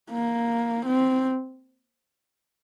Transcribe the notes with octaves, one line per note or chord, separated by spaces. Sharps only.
A#3
C4